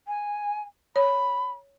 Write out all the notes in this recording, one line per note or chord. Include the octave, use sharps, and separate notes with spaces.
G#5
C#5 B5